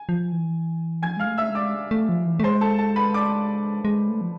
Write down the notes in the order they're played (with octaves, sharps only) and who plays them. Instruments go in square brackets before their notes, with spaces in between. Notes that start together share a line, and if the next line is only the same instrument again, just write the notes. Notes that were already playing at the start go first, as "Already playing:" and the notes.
Already playing: [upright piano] G#5
[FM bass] F3
E3
[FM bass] F3 [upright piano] G#5 G#6
[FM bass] G#3 [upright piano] F5 F6
[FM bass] A3
[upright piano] E5 E6
[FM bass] G#3
[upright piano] D5 D6
[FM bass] A3
F3
E3
A3
[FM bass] G#3 [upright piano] C5 C6
[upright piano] A4 A5
A4 A5
B4 B5
D5 D6
[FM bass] G#3
A3
F3